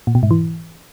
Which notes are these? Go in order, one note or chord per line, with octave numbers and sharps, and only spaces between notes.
A#2
B2
G#2
E3